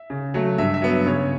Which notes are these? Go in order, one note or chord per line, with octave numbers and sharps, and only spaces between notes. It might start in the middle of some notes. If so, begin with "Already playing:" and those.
Already playing: E5
C#3
F#3 A3
G2 E5
E5
F#3 B3
C#3 C#5